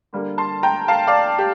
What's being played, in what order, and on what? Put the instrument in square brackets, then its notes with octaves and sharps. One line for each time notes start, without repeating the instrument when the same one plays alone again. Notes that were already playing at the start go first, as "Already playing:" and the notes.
[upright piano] D3 G3 A#3
A5 C6
G5 A#5
F5 A5
D5 F5
G4